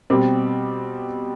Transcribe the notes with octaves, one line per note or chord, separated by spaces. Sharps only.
B2 G3 C4 G4